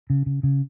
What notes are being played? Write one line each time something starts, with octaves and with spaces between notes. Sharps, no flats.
C#3
C#3
C#3